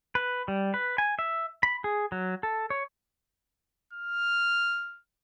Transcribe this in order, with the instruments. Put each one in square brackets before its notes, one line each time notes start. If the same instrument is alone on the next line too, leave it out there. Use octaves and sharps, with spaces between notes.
[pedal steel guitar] B4
G3
B4
G#5
E5
B5
G#4
F#3
A4
C#5
[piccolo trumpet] F6